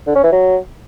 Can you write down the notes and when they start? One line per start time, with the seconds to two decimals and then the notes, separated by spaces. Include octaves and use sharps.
0.07 D3
0.15 C#4
0.24 E3
0.32 F#3